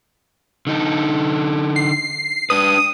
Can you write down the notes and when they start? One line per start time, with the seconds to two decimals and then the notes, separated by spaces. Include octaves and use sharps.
0.67 D3 D#4 A4
1.76 C7
2.50 D4 B4 D#6